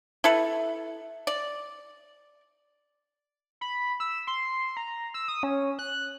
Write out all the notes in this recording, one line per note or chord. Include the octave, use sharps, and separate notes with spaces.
E4 A4 B4
D5
B5
E6
C6
A#5
E6
D#6
C#4
F#6